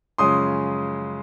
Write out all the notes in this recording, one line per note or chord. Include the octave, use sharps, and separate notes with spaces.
F#2 C#3 F3 G#3 C#4 C6 D#6